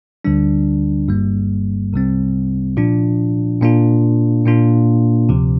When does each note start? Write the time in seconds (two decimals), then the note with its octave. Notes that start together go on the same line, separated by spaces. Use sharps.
0.25 D2 D3 G3 D4
1.08 G1 G2 G3 A#3
1.93 C2 C3 G3 C4
2.77 A#2 F3 D4 F4
3.61 A#2 A#3 D4 F4
4.45 A#2 A#3 D4 F4
5.29 D2 C3 F3